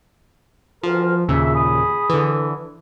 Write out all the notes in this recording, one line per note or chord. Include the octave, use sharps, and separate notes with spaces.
D2 E3 F3 A#4
D#2 A#2 C#3 E5
G#4 B5 D#6
D3 E3